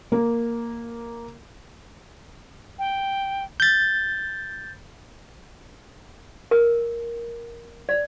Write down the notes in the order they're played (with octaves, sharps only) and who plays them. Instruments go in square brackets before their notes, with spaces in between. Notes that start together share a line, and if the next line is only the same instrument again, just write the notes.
[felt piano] A#3
[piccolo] G5
[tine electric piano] G6 A6
[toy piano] A#4
D5